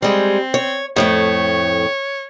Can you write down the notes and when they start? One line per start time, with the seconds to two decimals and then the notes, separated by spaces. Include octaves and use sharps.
0.02 G3 G#3 C4
0.54 C#5
0.96 F2 A2 A3 C#5